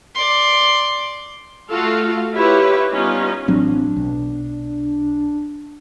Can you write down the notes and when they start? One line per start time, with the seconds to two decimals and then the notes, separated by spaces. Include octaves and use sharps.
0.15 D5 C6
1.69 A3 F4 F#4 A4 F5
2.36 E4 F4 G4 B4 C#5
2.91 G3 B3 C#4 D#4 F4
3.48 A1 F#3 C4 D4
3.96 B1